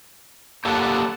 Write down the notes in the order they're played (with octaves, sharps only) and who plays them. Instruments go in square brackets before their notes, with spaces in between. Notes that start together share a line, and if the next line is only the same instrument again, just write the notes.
[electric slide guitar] A#3 G4 A4 [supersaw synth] F#5 A5